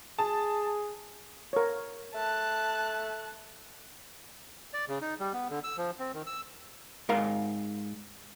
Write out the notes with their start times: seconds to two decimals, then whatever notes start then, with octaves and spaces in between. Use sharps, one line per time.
0.19 G#4 A5
1.53 A#4 C#5
2.14 A3 A5 F#6
4.74 D5
4.88 C#3
5.01 D#4
5.20 G3
5.34 B3
5.50 D3
5.64 E6
5.78 F3
5.99 C4
6.14 D#3
6.27 E6
7.09 G#2 A#4 F5 A#5